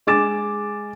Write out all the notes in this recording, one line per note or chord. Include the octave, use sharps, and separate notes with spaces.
G#3 G#5 D6 A6 E7